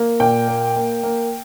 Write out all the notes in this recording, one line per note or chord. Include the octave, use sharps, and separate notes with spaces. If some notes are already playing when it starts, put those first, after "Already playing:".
Already playing: A#3
A#2 G5
A#3
A#3
A#3